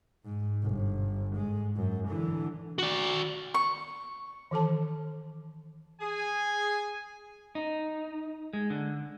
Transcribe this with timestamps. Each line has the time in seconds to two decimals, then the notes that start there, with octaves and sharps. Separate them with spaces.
0.24 G#2
0.63 G1
1.35 G#2 G#3
1.76 F#2
2.09 D3 E3
2.79 F#4 D5
3.54 C#6
4.51 D#3 E3 A4 A5
6.01 G#4 G#5
7.55 D#4
8.53 G#3
8.70 D3